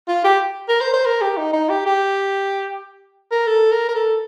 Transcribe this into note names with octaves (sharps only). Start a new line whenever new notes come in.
F4
G4
A#4
C5
C5
A#4
G4
D#4
D#4
G4
G4
A#4
A4
A#4
A#4
A4